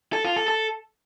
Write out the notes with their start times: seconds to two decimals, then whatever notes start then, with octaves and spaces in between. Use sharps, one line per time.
0.13 A4
0.25 F4
0.36 A4
0.48 A4